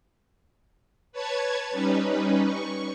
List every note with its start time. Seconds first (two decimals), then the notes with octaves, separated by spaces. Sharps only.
1.12 B4 C#5 A5 G#6
1.71 G3 C#4 D#4 B4
2.43 C#6